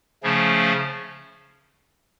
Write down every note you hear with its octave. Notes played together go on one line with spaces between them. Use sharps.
C#3 F3 A3 C#4